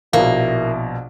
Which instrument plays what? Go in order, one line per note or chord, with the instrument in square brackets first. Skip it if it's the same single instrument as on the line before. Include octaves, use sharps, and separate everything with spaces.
[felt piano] A#1 B2 [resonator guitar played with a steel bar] A#3 [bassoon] E4